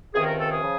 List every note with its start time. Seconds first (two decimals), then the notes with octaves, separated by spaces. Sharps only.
0.14 C#2 C3 D#3 G#4
0.26 A#4
0.39 A4
0.51 G#4
0.64 C#3 F3